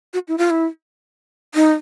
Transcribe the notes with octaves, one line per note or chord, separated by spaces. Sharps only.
F#4
E4
F4
E4
D#4